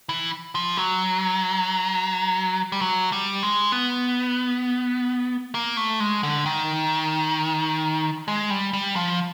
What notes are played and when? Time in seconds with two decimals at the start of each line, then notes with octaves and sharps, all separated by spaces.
0.09 E3
0.55 F3
0.77 F#3
2.72 G3
2.81 F#3
3.12 G3
3.43 G#3
3.72 B3
5.55 A#3
5.77 A3
6.00 G#3
6.23 D3
6.46 D#3
8.28 G#3
8.50 G3
8.73 G3
8.96 F3